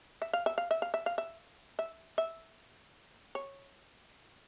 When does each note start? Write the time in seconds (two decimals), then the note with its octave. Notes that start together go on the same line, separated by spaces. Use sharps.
0.22 E5
0.33 F5
0.46 E5
0.58 F5
0.71 E5
0.82 F5
0.94 E5
1.06 F5
1.18 E5
1.79 E5
2.18 E5
3.35 C#5